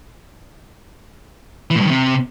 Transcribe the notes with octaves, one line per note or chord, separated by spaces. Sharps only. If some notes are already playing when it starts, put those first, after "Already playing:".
E3
A2
G2
D#3
C3